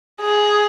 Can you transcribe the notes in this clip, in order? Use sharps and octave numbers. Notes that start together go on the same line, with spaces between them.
G#4